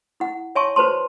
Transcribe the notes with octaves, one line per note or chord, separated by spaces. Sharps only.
E4 F#5
C#5 E5 G#5 A5 C6 C#6
F#4 B4 C5 A5 C6